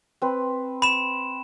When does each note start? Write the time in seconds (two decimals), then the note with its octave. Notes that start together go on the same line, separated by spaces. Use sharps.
0.22 C4 B4
0.82 B5 E7